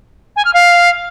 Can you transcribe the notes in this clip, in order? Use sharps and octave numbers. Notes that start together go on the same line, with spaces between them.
G#5
F6
F5